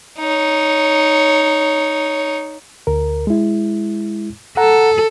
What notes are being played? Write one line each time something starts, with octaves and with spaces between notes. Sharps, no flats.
D#4 C#5
D2 A#4
G#3 E4
A4 F#5 A#5